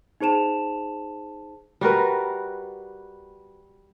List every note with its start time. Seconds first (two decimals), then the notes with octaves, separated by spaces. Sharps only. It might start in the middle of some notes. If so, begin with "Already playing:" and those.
0.21 D#4 G#4 C5 A5 E7 F7
1.81 G3 F#4 A#4 B4